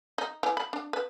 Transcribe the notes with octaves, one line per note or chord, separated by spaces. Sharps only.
D#4
E3
B5
D4
B4